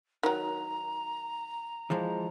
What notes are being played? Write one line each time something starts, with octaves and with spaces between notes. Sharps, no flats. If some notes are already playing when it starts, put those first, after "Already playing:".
D#3 F#3 A#5
E3 F3 G#3